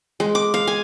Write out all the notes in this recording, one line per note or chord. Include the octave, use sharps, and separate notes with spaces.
G#3
D6
F5
G#5